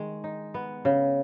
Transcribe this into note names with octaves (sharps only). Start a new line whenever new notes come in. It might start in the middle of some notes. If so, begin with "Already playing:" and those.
Already playing: D#3 G#3
D#4
B3
C#3